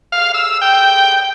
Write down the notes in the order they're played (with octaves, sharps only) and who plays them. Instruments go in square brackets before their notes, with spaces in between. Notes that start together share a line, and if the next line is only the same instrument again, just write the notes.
[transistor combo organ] F5
E6
G5